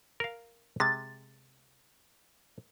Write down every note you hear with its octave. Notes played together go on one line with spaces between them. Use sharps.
A#4 F5
C3 G#3 A6